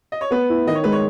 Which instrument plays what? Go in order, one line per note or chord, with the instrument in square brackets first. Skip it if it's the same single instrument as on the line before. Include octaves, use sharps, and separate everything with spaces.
[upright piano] D#5
C#5
[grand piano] B3 [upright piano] B4
[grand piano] E4
[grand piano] D#3 [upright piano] D#5
[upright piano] C#5
[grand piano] G#3 [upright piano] B4
[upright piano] C#5